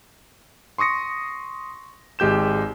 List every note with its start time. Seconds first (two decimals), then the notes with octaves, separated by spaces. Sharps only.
0.78 C6 C#6 D#6 A#6 C#7
2.19 G#1 G#3 G4 G6 E7